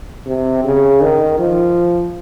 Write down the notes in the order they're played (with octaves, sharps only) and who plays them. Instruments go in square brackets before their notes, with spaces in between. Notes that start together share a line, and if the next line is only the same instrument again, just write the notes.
[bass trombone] C3
C#3
D#3
F3